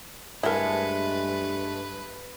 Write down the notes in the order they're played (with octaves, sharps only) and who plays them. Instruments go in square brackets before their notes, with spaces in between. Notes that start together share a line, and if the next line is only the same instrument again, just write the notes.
[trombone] G2 [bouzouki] G#3 A3 [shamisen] E4 A#4 [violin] B4